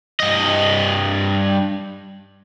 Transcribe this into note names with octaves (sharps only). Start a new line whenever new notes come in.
G2 D#5